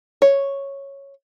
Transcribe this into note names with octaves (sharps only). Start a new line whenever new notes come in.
C#5